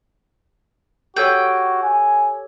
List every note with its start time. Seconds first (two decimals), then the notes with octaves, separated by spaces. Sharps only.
1.16 F#4 G4 A4 C#5 G5
1.83 G#5